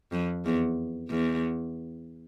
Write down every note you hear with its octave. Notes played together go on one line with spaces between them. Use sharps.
F2
E2
E2